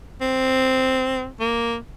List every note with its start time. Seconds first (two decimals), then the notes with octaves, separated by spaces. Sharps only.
0.21 C4
1.40 A#3